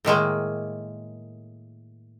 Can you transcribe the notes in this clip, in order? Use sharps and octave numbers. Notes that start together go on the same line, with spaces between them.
A2 D#3 G#3 A#3